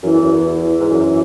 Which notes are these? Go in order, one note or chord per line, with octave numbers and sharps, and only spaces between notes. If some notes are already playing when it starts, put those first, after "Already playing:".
F#2 E3
E2
F#2
E2
E3
G#2
F#2